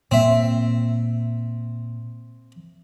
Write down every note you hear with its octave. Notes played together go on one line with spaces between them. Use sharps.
A#2 A#3 C4 E5